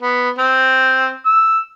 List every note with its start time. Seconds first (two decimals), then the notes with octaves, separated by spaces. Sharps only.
0.01 B3
0.38 C4
1.25 E6